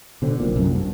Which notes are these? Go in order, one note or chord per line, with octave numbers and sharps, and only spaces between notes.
B2 D3 C4
B1 A#2
C2 F#2
G2